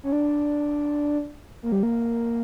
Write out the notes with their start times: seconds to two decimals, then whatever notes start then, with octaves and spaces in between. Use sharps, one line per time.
0.03 C#4
0.12 D4
1.63 A#3
1.72 G3
1.83 A#3